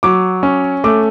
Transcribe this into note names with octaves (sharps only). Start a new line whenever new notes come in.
F#3 D6
C#4
A3 D6